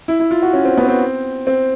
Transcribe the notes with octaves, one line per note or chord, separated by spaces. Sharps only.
E4
E4
F4
F#4
C#4
C4
B3
C4
C4